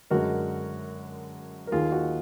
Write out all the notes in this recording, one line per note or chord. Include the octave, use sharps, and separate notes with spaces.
F#2 D3 G#3 F#4 A#4
A#4
D#2 D#3 A#3 F4 G#4
F#4